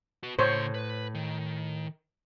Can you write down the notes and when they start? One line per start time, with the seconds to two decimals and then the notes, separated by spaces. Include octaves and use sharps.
0.23 F#4 B4
0.39 A2 C#3 C5 C#5 C6
0.74 B4
1.15 D#3